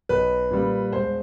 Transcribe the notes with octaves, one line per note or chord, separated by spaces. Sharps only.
B1 B4
A#2 G3
E1 C5